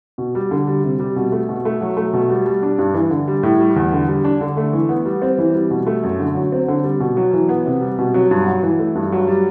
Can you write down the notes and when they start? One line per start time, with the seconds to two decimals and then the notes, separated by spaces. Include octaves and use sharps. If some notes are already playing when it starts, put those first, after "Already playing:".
0.18 B2
0.35 G3
0.51 D3
0.67 G3
0.84 C3
1.00 G3
1.16 B2
1.32 A3
1.49 B2
1.65 A3
1.81 F#3
1.97 A3
2.13 B2
2.29 G3
2.46 G3
2.63 D4
2.78 G2
2.94 E3
3.10 D3
3.28 G3
3.43 A2
3.59 G3
3.76 E2
3.93 D3
4.08 G3
4.25 D4
4.41 D3
4.57 A3
4.73 E3
4.89 B3
5.05 G3
5.22 C4
5.38 E3
5.54 G3
5.70 B2
5.87 A3
6.03 F#2
6.19 D3
6.35 F#3
6.52 C4
6.68 D3
6.84 G3
7.00 B2
7.17 F#3
7.33 E3
7.49 B3
7.66 C3
7.81 G3
7.98 B2
8.14 F#3
8.31 G2
8.47 F#3
8.63 E3
8.79 A3
8.95 G2
9.12 F#3
9.27 G3